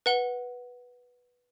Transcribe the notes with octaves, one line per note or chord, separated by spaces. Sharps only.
B4 F#5 G7